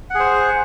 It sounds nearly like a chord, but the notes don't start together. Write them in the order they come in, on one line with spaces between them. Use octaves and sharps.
F#5 G#4 C5